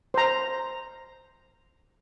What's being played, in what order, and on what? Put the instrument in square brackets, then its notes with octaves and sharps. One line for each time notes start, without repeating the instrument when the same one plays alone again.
[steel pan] C5 A#5